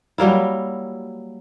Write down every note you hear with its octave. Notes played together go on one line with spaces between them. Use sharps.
F#3 G3 A#3 E4